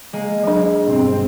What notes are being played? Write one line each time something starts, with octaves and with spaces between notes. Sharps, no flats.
G#3 A#3
F#3 D4
G1 B2 C4